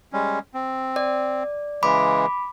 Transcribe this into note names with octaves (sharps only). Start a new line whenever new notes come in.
G3 G#3 C#4
C4
D5
C#3 E3 G#3 B5 D6